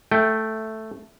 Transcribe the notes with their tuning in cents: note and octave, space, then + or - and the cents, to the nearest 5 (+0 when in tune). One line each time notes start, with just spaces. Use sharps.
A3 +0 G5 +0